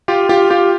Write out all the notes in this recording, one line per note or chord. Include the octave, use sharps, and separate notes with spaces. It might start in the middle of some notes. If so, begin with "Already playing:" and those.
F4 G4
F4 G4
F4 G4